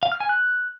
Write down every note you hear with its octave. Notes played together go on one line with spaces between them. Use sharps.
F5
F6
G#5
F#6